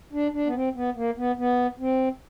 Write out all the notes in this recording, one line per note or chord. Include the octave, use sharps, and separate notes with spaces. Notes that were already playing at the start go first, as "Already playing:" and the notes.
D4
D4
B3
C4
B3
A#3
B3
B3
C4